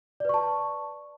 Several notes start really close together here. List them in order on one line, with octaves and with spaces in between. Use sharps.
D5 B4 C#6 A5